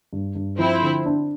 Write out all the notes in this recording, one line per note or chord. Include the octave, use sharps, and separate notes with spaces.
G2
G2
F3 C4 E4
D3
D4